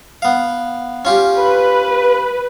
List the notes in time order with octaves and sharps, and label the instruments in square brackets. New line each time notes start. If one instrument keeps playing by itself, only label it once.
[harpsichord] B3 F5
C#4 F4 G4
[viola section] B4